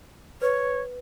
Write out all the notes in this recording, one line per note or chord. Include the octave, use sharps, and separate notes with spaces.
B4 C#5